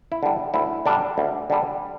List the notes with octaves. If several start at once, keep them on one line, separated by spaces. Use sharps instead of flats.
E4
D3 G3
D2 E4
D3 G3 D4
D2
D3 G3